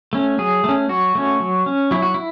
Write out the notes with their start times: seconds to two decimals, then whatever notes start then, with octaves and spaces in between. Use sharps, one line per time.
0.13 A3 C#4
0.38 F#3 G#4
0.64 A3 C#4
0.89 F#3 F#4
1.15 A3 C#4
1.40 F#3
1.66 C#4
1.91 F#3 E4
2.02 F#4
2.14 E4